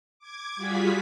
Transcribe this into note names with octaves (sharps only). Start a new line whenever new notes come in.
D6 G#6
G3 F4 F#4 G#4 B6